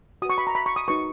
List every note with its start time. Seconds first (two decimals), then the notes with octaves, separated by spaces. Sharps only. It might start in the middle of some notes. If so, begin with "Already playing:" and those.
0.22 F#4 D#6
0.25 B4 C#6
0.38 B5
0.47 A#5
0.55 B5
0.66 C#6
0.76 D#6
0.88 D#4 F#4 B4 C#6